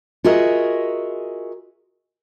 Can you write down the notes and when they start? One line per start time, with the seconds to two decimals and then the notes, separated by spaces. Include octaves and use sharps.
0.24 F4 F#4 G#4 A#4 D#5 E5